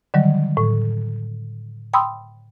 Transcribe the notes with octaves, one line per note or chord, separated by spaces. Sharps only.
D3 D#3 F#3 G3
A2
G5 B5 C6 D#6 E6